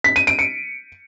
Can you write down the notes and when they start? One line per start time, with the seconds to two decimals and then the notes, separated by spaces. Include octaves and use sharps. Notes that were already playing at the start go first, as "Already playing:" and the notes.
0.04 B6
0.16 D#7
0.27 D7
0.39 C#7